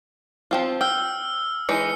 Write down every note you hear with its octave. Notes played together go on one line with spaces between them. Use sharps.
F3 C4 F4
G5 E6 F6
E3 G#3 D#4 C#7